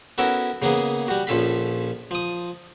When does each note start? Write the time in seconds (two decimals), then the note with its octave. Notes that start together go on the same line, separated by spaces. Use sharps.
0.18 B3 C#4 E4 F#4 A4 A#4
0.62 C#3 A#3 B3 G#4
1.08 G3 F#4
1.27 A#1 F3 C#4 A4 F5 B5
2.11 F3 D#6